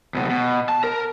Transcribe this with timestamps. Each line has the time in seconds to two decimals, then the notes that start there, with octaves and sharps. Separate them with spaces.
0.14 C#2 B2
0.29 B2
0.69 A5
0.84 A#4